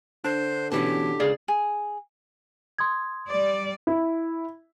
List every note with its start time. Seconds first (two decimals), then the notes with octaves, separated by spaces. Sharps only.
0.24 D3 D4 C5
0.72 B2 E3 C#4 G4 A5
1.20 C#2 G#4 D5 F5
1.48 G#4
2.79 C6 D#6 G#6
3.28 G3 D5
3.87 E4